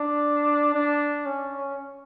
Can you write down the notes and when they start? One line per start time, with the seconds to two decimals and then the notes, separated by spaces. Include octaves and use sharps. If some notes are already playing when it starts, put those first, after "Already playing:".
Already playing: D4
0.74 D4
1.26 C#4